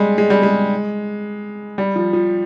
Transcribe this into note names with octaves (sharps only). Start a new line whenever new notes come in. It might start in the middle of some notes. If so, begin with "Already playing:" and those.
Already playing: G3 G#3
G#3
G3
G#3
G3
F3
F3